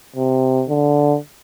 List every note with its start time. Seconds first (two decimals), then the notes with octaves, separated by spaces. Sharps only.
0.16 C3
0.69 D3